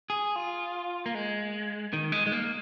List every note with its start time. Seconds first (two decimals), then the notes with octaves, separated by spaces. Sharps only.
0.10 G#4
0.36 F4
1.06 A#3
1.15 G#3
1.93 D#3
2.12 G#3
2.27 G#3
2.32 A#3